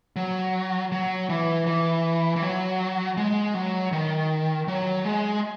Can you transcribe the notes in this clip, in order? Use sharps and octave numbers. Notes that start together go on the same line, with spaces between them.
F#3
F#3
E3
E3
E3
F#3
G#3
F#3
D#3
F#3
G#3